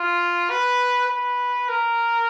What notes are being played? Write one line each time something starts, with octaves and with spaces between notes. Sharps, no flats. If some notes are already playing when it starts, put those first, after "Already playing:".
Already playing: F4
B4
B4
A#4